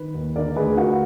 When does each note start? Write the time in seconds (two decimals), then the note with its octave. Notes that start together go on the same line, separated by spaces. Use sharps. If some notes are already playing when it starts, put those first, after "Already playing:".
Already playing: D#3 B4
0.15 D#2
0.36 D3 A#4 D5
0.56 D2 G#4 B4
0.77 D3 F#4 A#4